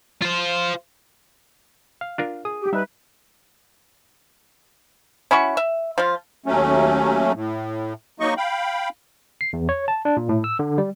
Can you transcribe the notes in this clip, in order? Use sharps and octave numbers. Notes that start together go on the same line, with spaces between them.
F4 C5
F5
D4 F4 A#4
G#4 D#6
G4
G3 D#4 B4 E5
C#4 E4 F#4 C#6
E5
F3 F4
D#2 F#3 A3 C#4
A2
F#3 A#3 D#4 D#5 C#6
F5 G5 B5
C7
E2
C#5
A5
D4
A#2
A2
E6
D3
G3